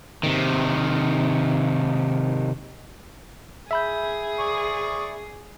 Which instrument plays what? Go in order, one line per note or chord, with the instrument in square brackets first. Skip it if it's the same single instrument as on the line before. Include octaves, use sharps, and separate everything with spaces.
[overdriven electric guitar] C3 D#3
[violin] G#4 [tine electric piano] E5 B5 G6
[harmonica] D5 C#6 D#6